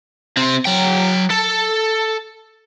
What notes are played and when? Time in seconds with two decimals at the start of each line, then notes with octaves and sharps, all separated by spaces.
0.37 C3 C4
0.65 F#3 G5
1.31 A4